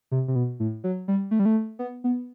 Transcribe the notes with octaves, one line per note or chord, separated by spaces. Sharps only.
C3
C3
B2
A2
F#3
G3
A3
G3
A3
B3
B3